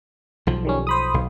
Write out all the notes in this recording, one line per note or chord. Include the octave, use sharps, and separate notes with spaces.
B1 F3
D#3 G3 C#4
C5 B5 D#6
B1